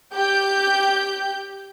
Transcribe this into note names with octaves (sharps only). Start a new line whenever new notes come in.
G4 G6